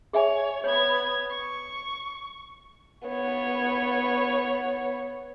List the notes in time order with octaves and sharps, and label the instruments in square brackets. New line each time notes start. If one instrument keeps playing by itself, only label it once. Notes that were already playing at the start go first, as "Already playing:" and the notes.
[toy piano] G#4 E5 G#5 [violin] C#5
[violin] B3 G#6 [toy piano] C#5
[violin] C#6
[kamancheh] B3 C#5